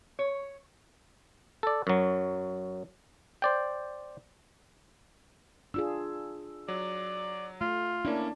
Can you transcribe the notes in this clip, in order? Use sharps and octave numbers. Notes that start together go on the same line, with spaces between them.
C#5
A4 D5
F#2 F#3
C5 D5 G5
D4 F4 G#4 E6
F#3 D5
A3 F4
A#3 C#4 D4 E4